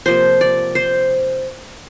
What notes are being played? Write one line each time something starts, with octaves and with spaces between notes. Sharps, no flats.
C3 F3 A#3 C5
D5
C5